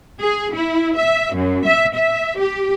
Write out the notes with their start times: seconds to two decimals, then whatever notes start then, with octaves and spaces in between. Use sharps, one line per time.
0.20 G#4
0.55 E4
0.97 E5
1.34 F#2
1.66 E5
1.96 E5
2.39 G4